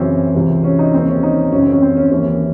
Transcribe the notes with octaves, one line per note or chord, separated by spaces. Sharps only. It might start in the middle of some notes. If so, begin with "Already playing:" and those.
Already playing: F#2 C#3 E3 C4 C#4
C#2 C3 E3
C#4
D#4
D#2 C#3 E3 C4
C#4
D#4
F#2 C#3 E3 C#4
C4
C#4
C4
C#4
D#2 C#3 E3 C#4